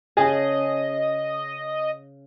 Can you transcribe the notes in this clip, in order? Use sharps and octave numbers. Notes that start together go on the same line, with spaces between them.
C#3 G#4 D#5 G#5 A5